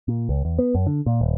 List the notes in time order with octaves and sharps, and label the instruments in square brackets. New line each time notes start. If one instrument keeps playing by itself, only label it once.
[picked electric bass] A#2
C#2
E2
B3
F#2
D3
A#2
D#1